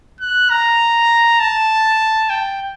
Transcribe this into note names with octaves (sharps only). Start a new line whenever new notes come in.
F#6
A#5
A5
G5